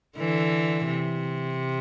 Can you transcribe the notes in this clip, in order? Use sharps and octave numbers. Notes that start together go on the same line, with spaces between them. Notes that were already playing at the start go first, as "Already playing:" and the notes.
D3 E3
C3